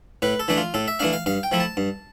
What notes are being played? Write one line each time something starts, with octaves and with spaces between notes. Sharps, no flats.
A2 B4
A4
E3 A3 D4
F4
A2 A4
E5
E3 A3 D4 F5
F5
G2 F5
G5
F3 A3 E4
A5
G2